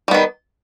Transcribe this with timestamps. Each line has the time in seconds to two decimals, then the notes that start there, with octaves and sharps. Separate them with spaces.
0.08 G3
0.11 B3
0.14 D#3